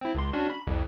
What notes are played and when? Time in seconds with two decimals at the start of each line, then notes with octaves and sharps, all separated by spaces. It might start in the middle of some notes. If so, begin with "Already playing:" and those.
0.01 C4 E4
0.15 C#2 C6
0.33 C#4 D4 F#4
0.50 B5
0.67 C2 F2